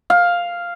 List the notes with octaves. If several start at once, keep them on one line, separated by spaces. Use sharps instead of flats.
F5